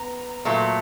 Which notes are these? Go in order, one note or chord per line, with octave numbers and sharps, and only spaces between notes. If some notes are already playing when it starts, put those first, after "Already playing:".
Already playing: B3 A#5
A#2 F#3 A3